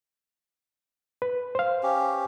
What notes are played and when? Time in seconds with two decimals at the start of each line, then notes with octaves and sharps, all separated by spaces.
1.22 B4
1.55 C5 F5
1.83 C#4 G4